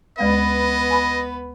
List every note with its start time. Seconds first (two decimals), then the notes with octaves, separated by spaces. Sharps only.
0.18 D2 G#3 B3 B4 D#5 F5
0.91 G#5 B5